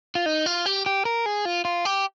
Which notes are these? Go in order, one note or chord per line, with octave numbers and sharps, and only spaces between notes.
F4
D#4
F4
G4
G4
A#4
G#4
F4
F4
G4